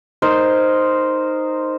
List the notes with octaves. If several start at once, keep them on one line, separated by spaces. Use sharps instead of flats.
D#4 A#4 C5 C6